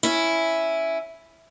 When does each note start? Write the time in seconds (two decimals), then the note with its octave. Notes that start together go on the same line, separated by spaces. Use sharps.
0.03 C#4 E4